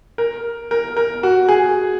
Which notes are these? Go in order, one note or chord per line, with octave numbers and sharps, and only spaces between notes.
A#4
A#4
A#4
F#4
G#4